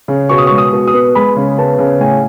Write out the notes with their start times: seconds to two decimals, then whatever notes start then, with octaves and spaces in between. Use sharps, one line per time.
0.08 C#3
0.29 B2 C#6
0.38 D#6
0.47 C#6
0.51 G#3
0.58 D#6
0.73 B2
0.87 D#6
0.93 B3
1.15 G#3 B5
1.36 C#3
1.58 B3 A5
1.79 C#3
2.00 A2 G#5